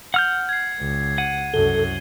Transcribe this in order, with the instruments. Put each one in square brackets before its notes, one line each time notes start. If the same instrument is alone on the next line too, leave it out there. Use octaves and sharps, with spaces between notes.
[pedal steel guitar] F#5 F6 G6
[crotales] G#6 C7
[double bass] C#2
[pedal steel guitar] F#5 [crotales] D#7
[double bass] C2 F#2 [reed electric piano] A4 [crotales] G7